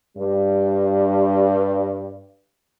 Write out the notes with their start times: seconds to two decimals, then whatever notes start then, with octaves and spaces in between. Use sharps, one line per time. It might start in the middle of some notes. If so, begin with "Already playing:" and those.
0.17 G2 G3